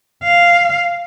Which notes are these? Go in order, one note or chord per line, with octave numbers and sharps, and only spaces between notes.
F5